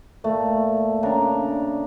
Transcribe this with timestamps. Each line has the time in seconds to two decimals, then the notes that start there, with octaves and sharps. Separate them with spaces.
0.24 A#2 A3
1.03 C#3 D4 A#4